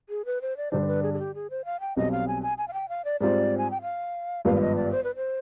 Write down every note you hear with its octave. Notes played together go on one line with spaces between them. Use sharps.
G#4
B4
C5
D5
G2 D3 G3 D4 C5
C5
B4
G#4
G#4
G4
G#4
C5
F5
G5
B1 B2 G3 C4 D#5
F5
G#5
G#5
G#5
F5
G5
F5
D5
G#2 G3 C4 F4 C5 D5
G#5
G5
F5
G#1 G2 F3 B3 F5
F5
D#5
D5
C5
B4
C5